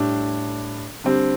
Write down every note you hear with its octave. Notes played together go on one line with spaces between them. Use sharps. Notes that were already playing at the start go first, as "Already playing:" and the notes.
Already playing: A2 G3 D4
D3 G3 C4